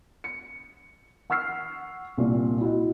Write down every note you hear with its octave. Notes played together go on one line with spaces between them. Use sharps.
C#7
F#5 C#6 E6 F6 C7
C2 A#2
E4 F#4 D#5